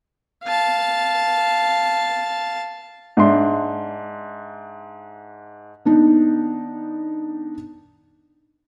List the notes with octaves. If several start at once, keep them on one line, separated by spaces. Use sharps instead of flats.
F5 A5
G#2 D4 E5 C6
D#3 B3 D4 D#4